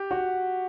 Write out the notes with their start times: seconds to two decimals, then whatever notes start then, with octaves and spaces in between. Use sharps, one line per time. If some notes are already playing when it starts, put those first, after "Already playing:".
Already playing: G4
0.11 F#4